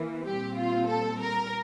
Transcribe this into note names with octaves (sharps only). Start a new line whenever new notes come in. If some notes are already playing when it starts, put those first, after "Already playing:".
Already playing: E3 A#3
A#2 G3 C4 G4
F4
A4
A#4